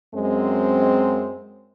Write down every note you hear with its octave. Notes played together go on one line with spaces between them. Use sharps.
F#2 G#3 C4